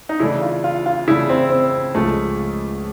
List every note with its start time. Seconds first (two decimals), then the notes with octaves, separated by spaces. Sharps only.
0.09 D#4
0.20 C#3 E3 A3 D4 E4
0.42 F4
0.64 F4
0.86 F4
1.08 C#3 E3 A3 D4 E4
1.29 C4
1.50 C4
1.95 C#2 C#3 F3 A3